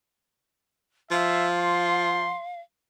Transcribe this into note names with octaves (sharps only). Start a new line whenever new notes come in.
F3 E5 F5
C6